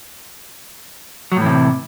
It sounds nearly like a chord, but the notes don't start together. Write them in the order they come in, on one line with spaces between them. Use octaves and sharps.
F#3 A2 E3 C3